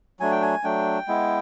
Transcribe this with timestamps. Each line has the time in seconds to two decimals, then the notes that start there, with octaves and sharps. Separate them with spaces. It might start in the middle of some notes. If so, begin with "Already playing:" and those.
0.20 F#3 A3 D4 G#5
0.32 G5
0.42 G#5
0.64 F#3 A3 D4 G5
1.08 G#3 B3 E4